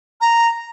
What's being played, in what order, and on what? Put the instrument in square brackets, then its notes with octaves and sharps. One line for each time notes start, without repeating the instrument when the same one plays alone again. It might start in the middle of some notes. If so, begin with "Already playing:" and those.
[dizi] A#5